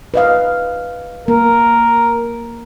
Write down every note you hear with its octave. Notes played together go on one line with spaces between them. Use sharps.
B4 D#5 F5
A#3 A#4